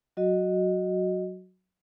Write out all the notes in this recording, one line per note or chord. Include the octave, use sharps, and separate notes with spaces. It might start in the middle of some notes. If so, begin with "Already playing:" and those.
F#3 F#4 D#5